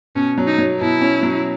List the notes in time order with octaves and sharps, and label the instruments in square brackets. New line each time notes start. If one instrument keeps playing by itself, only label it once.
[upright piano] B2 [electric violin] C#4
[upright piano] F#3
[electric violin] D#4
[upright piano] F#3
[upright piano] B2 [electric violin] E4
[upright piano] C#4
F#3